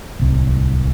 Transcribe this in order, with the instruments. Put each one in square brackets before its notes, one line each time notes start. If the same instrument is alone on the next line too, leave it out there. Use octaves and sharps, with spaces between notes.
[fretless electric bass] D1 C2